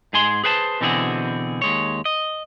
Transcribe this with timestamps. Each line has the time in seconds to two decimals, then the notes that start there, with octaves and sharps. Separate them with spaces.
0.13 G#2 G#4 G#5 C6
0.44 G#4 B4 C5 G#5 A5
0.81 B2 D3 E3 C4 F#4 G#4
1.62 D#2 G#3 C#5
2.05 D#5